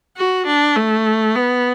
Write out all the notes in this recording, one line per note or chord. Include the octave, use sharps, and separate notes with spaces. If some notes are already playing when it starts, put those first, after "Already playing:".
F#4
D4
A3
B3